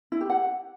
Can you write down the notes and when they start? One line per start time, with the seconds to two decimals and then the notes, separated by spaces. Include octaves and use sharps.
0.12 E4
0.21 G4
0.30 F#5